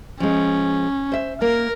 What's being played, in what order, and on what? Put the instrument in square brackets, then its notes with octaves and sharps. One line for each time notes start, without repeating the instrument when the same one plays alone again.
[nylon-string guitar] F3 G#3 [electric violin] C#4
[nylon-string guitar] C5 E5
[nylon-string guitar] A#3 [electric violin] A#4